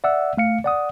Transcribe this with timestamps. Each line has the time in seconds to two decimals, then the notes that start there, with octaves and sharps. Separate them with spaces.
0.04 D5 E5 F#5 E6
0.37 A3 F5 C#7
0.64 D5 F#5 D#6